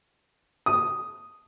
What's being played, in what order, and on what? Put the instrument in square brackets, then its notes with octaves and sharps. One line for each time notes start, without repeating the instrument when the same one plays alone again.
[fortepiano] D#6